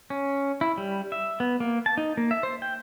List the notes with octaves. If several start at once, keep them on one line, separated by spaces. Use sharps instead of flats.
C#4
E4
G3
E5
B3
A#3
A5
D#4
A#3
E5
C5
G5